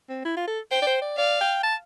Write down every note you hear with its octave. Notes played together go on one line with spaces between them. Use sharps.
C4
E4
F4
A4
C5 G5
D5
C5
D5
D5 F5
G5
A5